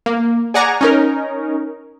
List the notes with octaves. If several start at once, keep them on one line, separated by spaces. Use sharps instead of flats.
A#3
G#4 D5 F#5 G#5 A#5
C#4 D#4 A#4